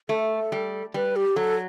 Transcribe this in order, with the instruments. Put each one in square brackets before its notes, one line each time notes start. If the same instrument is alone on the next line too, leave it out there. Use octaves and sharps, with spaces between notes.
[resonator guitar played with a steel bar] A3 [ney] A4
[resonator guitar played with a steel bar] G3
[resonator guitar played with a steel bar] G3 [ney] B4
[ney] G4
[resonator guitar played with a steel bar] F#3 [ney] A4